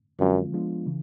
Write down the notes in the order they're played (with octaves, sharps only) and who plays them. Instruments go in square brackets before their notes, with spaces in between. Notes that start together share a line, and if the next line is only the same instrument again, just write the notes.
[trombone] F#2 [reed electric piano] D3 F3 G#3 C4 F4
[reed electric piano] F3 G#3 B3 D4 F4
C#3 E3